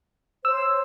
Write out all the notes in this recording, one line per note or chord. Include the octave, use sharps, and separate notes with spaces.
C5 C#5 E6